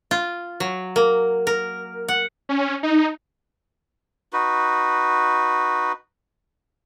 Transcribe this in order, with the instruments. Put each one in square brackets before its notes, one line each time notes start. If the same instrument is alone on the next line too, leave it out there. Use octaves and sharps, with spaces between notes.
[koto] F4
F#3
A#3
A#4
F#5
[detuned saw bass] C#4
D#4
[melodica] D#4 F#4 B4